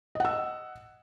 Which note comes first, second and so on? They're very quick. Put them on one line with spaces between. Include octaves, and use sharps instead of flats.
D#5 F#5 E6